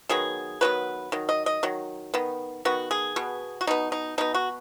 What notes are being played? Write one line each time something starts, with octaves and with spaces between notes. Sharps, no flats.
D#3 F#3 B3 G#4
D#3 F#3 B3 B4
D#3 F#3
D#5
D#5
D#3 F#3
D#3 B3
D#3 B3 F#4
G#4
B2 B3
F#4
B2 B3 D#4
D#4
B2 B3 D#4
F#4